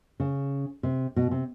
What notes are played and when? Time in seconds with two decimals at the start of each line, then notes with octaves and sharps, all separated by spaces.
0.20 C#3
0.83 C3
1.16 B2
1.31 C3